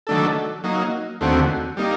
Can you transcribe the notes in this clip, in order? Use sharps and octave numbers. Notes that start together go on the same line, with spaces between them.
D#3 F#3 A3 D4 A4
F#3 A#3 D#4
D#2 D3 A3 C4 F#4
G3 A#3 D#4